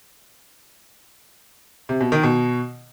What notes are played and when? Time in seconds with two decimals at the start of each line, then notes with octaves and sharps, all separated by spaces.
1.89 C3
2.00 B2
2.12 D#3
2.23 B2